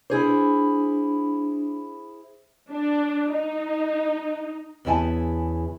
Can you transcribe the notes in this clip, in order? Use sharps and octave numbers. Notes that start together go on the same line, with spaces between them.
D4 E4 G#4 C5
D4
D#4
E2 C#3 E4 E5 G#5 A5